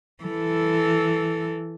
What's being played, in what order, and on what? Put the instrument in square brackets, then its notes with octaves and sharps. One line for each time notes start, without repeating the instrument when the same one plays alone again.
[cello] E3 A4